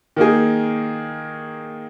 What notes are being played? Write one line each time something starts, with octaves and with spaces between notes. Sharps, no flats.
D#3 A#3 D#4 G#4